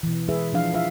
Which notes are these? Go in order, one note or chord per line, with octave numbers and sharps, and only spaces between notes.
B2 E3
G#3 E4 G#4 B4 E5
F3 D4 F5
F4 E5 F5